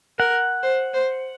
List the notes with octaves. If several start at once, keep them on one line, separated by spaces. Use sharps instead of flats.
A#4 F#5
C5
C5